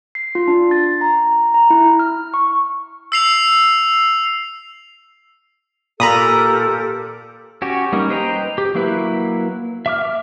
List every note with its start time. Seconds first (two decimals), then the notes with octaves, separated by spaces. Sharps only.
0.15 C7
0.35 F4
0.48 D4
0.71 A6
1.01 A#5
1.54 A#5
1.70 E4
1.99 F6
2.34 C#6
3.12 E6 C7 F7
6.00 A#2 G4 A4 A#4 A#5 B5 D#6
7.62 C#4 F#4 G4
7.92 G3 A#3 C#4 D#4
8.10 B4 C5 D#5 G5 A#5
8.58 G4
8.75 F#3 A#3 E4 B4
9.86 E5 D6 F6